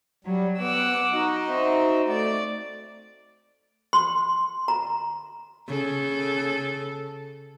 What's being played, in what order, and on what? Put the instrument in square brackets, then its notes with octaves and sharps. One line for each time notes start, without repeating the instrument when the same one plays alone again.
[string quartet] F#3 [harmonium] G3
[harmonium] B3 [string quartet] F#5 D6 E6
[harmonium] D#4 F#4 D#5
[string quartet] C4 E5
[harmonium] A3 [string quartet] D5
[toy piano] C6
A#5
[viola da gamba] C#3 A4